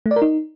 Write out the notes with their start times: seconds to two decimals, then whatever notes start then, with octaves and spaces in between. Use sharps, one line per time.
0.06 A3
0.11 D5
0.16 A#4
0.22 D#4